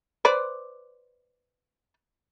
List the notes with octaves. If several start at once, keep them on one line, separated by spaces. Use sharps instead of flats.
B4 C5 D5